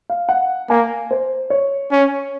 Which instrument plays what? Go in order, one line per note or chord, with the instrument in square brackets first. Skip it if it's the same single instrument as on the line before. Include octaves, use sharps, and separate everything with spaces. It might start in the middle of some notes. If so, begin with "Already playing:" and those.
[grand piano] F5
F#5
[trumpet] A#3 [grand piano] G#5
[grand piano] C5
C#5
[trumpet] C#4